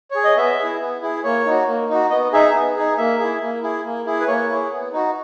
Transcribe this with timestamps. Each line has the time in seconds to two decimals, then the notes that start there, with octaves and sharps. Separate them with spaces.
0.11 G#4 C#5
0.24 D#5
0.36 B3 E5
0.58 G#4
0.63 E4
0.80 B3
1.02 E4 G#4
1.24 A#3 C#5
1.46 D#4 F#4
1.67 A#3
1.89 D#4 F#4
2.10 B3 D#5
2.33 D#4 G#4 E5
2.54 B3
2.76 D#4 G#4
2.97 A#3 E5
3.20 E4 G#4
3.41 A#3
3.63 E4 G#4
3.84 A#3
4.06 E4 G#4
4.20 B4
4.28 A#3 C#5
4.50 E4 G#4
4.71 B3
4.93 D#4 F#4